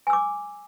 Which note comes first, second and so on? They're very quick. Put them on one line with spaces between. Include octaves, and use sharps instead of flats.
G#5 E6 D6